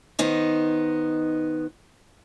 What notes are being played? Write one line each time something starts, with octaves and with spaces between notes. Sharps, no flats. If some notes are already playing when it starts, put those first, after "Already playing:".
D#3 B3 D#4 C5